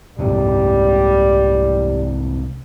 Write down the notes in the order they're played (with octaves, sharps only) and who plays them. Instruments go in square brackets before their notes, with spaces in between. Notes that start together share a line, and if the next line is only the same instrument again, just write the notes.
[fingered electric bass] C2 G#2 C3 [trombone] G3